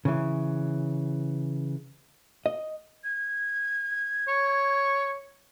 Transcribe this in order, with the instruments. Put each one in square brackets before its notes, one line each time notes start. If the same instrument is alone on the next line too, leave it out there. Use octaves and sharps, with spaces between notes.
[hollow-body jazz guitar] C#3 E3
D#5
[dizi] G#6
[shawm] C#5